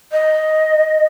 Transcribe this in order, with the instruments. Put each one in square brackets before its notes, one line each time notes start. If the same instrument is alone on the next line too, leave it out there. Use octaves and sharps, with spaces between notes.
[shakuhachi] D#5